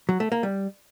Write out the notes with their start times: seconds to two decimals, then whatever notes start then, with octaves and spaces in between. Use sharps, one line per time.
0.09 F#3
0.20 A3
0.32 A#3
0.43 G3